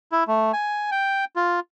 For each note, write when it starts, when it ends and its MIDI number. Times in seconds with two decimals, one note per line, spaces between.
0.12 0.24 64
0.28 0.52 57
0.53 0.90 80
0.91 1.25 79
1.36 1.60 65